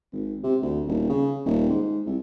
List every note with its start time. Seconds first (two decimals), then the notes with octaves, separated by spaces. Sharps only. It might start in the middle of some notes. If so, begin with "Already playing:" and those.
0.12 G#1
0.44 C3
0.62 D2
0.87 D#1
1.09 C#3
1.45 D#1
1.69 G#2
2.06 C2